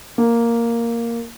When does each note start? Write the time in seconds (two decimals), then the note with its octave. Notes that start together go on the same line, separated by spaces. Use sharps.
0.18 A#3